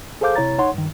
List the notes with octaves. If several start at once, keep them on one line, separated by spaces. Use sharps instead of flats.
G#4 A4 C5 F5 D6 G6
C3 E4 C#5 A#5 A6
D#4 C#5 F#5 C6
G2 D#3